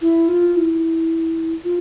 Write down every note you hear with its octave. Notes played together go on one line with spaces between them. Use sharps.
E4
F4
E4
F4